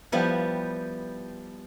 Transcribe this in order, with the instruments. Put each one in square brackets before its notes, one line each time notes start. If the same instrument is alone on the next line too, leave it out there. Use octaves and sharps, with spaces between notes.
[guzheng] F3 G3 B3 E4